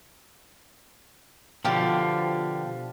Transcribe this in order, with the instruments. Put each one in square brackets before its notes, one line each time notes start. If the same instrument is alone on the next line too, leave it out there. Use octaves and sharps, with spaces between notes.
[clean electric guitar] B2 D3 F3 [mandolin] F4 G4